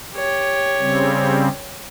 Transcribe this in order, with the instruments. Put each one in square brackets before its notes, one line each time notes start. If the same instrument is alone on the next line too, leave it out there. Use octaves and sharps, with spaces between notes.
[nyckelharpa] G4 C#5
[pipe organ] C#3 G3 C4